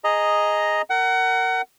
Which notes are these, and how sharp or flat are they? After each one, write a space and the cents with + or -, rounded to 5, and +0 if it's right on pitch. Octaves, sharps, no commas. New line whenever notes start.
G#4 +0 D#5 +0 A#5 +0
A#4 -20 F#5 +25